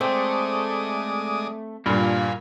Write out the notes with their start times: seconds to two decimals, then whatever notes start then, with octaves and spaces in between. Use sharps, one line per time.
0.01 G#3 A3 C4 D5 D#6
1.86 G2 A#2 A#3 F4 G#5 B5